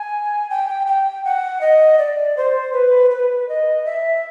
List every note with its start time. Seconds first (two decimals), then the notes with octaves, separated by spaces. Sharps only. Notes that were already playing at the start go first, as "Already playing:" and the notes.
Already playing: G#5
0.50 G5
0.87 G5
1.25 F#5
1.61 D#5
1.98 D5
2.37 C5
2.73 B4
3.11 B4
3.49 D#5
3.85 E5